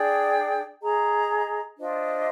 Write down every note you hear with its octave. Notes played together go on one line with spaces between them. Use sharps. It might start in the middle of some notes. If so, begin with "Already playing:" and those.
Already playing: D4 G#4 D5 G5
G#4 D#5 A#5
D4 F4 C5 D#5